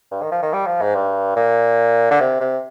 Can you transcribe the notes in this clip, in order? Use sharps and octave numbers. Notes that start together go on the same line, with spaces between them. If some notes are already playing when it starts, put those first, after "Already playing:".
G2
D#3
F3
D#3
G3
F3
G#2
G2
A#2
D3
C3
C3